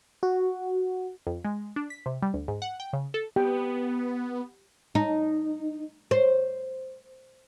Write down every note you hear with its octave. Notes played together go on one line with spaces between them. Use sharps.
F#4
F2
G#3
D4
B6
C3
G3
D2
G#2
F#5
G5
C#3
A4
B3 G4 G5
D#4
C5